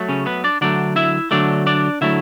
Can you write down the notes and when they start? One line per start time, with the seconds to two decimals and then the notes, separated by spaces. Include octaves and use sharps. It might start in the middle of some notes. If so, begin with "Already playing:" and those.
Already playing: F#3 A3
0.09 C#3 C#4
0.26 B3 B4
0.44 D4 D5
0.61 D3 F#3 A3 D4 D5
0.96 E4 E5
1.31 D3 F#3 A3 D4 D5
1.67 D4 D5
2.01 D3 F#3 A3 E4 E5